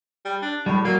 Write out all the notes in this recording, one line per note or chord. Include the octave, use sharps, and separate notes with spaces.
G3
D4
A2 G3
F#3 A#3